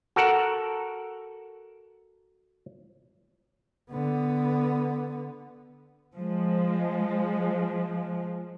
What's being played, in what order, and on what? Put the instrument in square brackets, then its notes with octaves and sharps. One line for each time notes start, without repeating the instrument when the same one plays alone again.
[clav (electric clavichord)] F#4 A4 A#4 F#5
[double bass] D3 B3
[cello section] F3 G#3